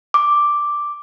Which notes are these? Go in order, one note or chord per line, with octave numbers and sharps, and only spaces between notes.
D6